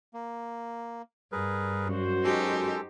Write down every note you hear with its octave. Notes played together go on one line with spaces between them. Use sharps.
A#3
G2 G#4 A#4 B4
F#2 F#4 C5
G#3 D#4 G4 A4